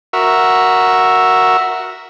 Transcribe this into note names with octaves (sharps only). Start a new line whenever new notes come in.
F#4 A#4 E5